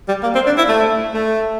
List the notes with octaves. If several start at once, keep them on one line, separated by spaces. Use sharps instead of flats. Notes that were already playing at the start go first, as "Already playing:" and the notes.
G3
A#3
C4
D4
E4
A3
A3